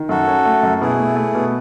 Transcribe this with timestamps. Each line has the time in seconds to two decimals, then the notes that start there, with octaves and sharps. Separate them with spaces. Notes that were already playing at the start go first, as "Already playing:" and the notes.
Already playing: D#3
0.09 F#2 F#4 A4
0.27 C#4
0.45 A3
0.63 F#2
0.81 B2 E4 G#4
0.99 A3
1.16 A3
1.35 B2